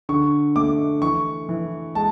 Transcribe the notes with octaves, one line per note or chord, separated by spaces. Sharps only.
D3 C#6
A3 D6
E3 C#6
E3
G#3 A5